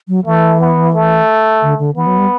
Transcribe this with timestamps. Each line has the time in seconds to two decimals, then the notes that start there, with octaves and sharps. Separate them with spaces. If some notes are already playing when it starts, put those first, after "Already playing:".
0.08 F#3
0.25 E3 A3
0.60 B3
0.93 A3
1.62 D3
1.79 D3
1.96 E3 B3
2.07 F#3
2.18 G3